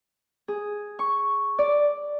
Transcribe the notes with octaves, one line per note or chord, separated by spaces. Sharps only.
G#4
C#6
D5